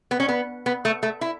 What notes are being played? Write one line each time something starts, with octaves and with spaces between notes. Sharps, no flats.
B3
C#4
B3
B3
A3
A3
E4